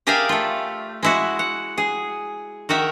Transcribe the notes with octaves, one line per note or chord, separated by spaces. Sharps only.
G4 G#4 A#4 D5 E5 F5
A3 F4
G#3 E4 F#4
F#5
G#4
D#3 F#4 A#4 E5